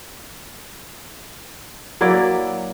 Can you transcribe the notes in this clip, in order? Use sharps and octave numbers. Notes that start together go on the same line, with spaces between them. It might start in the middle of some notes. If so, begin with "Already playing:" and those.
F#3 A#3 E4 D5